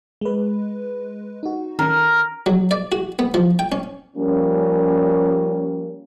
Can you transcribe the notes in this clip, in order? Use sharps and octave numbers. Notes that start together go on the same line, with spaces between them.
G#3 B4
D#4 F#4
D#3 C#4 A#4 A#5
F#3
D5
F#4
B3
F3
G5
C#4
F3 G3 A#3 C#4